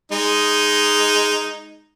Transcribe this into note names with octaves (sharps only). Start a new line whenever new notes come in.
G#3 D#4